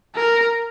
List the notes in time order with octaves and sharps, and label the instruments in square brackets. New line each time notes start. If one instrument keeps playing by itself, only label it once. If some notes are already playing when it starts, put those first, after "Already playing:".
[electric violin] A#4